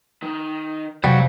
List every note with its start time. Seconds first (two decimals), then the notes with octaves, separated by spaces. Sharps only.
0.22 D#3
1.04 F2 C3 F#3 G3 C5 F5